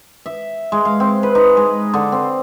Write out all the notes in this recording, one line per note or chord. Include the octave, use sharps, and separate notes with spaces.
E5
G#3
F5
C4
B4
D#4
G#3
D3
C4